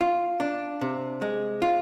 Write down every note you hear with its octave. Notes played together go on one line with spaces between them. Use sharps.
F4
D4
C3
G#3
F4